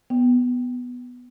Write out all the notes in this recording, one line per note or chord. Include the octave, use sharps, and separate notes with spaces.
B3